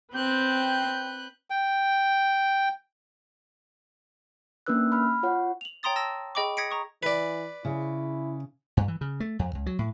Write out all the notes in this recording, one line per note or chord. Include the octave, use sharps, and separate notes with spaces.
C4 B4 G5 F#6 G6
G5
A#3 C#4 D4 B4 E6 F#6
B5 F6
F4 C#5 F#5
F7 F#7
C#5 G5 A#5 C6 D#6 A6
A5 E6 A#6
G#4 D#5 G5 B5 C#6 D6
D#6 G#6 A#6 B6 C#7 D7
A#5 C#6 D#6
E3 B4 D5
C#3 E4
G2
E3
C#3
A3
F2
C#2
F#3
A2